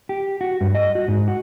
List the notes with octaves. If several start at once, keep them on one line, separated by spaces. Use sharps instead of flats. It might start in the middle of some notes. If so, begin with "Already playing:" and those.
G4
F#4
G2
D#5
F#4
G#2
F#4